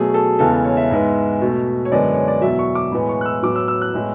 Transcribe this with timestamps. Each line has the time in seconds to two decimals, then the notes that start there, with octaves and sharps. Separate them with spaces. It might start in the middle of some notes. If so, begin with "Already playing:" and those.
Already playing: B2 F#3 A3 G#4
0.14 A4
0.39 E2 C#3 G#3 B3 A4
0.52 A4
0.64 C#5
0.77 E5
0.91 G#2 G#3 B3
1.41 B2 A3
1.85 C#5
1.92 F#2 D3 G#3 B3 D5
2.14 C#5
2.28 D5
2.41 E2 B2 F#3 E5
2.59 C#6
2.75 D6
2.92 A2 E3 G#3 B3 B5
3.09 C#6
3.21 F#6
3.26 E6
3.43 A2 F#3 B3 D6
3.56 E6
3.68 E6
3.82 F#6
3.94 A2 G#3 B3